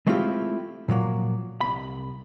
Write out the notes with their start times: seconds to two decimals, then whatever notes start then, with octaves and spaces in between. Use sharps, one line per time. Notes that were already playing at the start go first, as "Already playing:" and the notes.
0.07 G#3 A3 C4 E4 F4 G4
0.88 A#2 F3 F#3 A#3
1.61 C2 B5